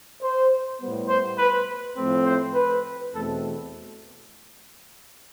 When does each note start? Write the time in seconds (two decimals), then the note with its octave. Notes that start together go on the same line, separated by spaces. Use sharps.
0.22 C5
0.80 A2 G3 B3
1.08 C5
1.38 B4
1.96 A2 F3 A3 C4
2.25 C5
2.54 B4
3.13 E2 B2 A3 C4 A4